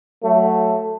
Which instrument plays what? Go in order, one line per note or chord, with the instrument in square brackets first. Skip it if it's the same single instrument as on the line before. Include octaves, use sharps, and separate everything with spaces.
[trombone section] F#3 A3